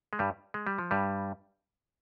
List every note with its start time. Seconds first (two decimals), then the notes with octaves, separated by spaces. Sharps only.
0.13 G#3
0.19 G2 G3
0.54 G#3
0.67 G3
0.78 F3
0.91 G2 G3